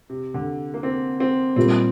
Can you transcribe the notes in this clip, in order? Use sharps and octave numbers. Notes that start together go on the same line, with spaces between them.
C3
D3
A#3
C4
C4
A#2 G3 A#3 C4